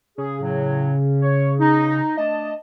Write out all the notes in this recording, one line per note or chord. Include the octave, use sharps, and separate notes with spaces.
C#3 G#4
A2 F#3
C#5
D#4
A3 D4 D#5 A5